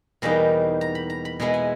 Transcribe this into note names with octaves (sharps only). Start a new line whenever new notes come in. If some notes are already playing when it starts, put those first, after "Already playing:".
E2 B2 G3 A#3 D#4 A#5
A#5
B5
A#5
B5
B2 G#3 B3 E4 A#5
G#5